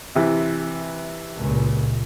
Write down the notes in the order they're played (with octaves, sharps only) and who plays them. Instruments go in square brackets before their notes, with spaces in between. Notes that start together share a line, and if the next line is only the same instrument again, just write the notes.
[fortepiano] C3 E3
[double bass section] C#2 A#2